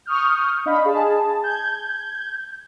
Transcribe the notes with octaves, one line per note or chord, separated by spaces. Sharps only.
C#6 D#6 F6 G6
D4 D#5 F5 B5
G#4 A5
G6 G#6